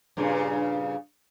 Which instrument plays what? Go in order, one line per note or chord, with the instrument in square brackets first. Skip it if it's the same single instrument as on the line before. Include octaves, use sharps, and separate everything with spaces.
[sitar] G2 A#2 C#3